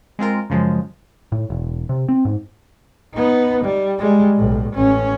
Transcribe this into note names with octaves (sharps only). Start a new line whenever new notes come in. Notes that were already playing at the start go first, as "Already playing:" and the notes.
G#3 C4 F4 A#4
F#2 C#3 F3 G#3
A2
E1
C3
C4
G#2
B3 D#4
G3
G3 G#3
B1 A2
A1 C#4